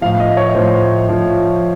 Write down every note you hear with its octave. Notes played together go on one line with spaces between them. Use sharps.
A2 F3 F5
D#5
C#5
A2 F3 C5
A2 F3